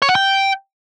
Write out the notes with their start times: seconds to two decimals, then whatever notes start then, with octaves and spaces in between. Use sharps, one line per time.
0.02 C#5
0.09 F#5
0.15 G5